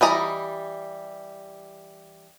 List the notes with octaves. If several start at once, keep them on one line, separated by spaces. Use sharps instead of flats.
E3 G3 D#5 A#5